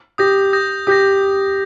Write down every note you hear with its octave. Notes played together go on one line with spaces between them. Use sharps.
G4 D#6 G6 A#6
D#6 G6 A#6
G4 D#6 G6 A#6